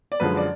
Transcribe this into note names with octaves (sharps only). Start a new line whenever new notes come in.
D5
F#2 D3 F3 G#3 B4
D5